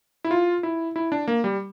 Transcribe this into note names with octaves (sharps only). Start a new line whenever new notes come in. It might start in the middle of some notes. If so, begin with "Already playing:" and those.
E4
F4
E4
E4
D4
A#3
G3